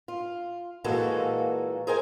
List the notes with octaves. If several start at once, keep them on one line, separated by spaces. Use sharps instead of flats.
F4
A#2 E3 G#3 A#3 F#4 A4
G#4 A#4 C5 D#5 G#5